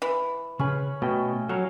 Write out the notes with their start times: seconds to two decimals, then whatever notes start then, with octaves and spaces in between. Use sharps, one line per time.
0.02 E3
0.59 C#3 C#4 G#4 B4
1.02 B2 A3 G5
1.49 F#3 A4 C#5 F5 A#5